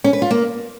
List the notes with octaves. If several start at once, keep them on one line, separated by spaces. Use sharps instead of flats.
C#4
B4
F4
A#3